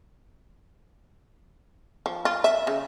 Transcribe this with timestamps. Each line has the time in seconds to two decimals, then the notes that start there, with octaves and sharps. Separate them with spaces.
2.06 F3
2.25 F4
2.44 E5
2.67 C#3